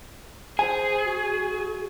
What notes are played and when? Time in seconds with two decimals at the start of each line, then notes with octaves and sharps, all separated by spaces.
0.59 G#4 C5 G#5
1.05 F#4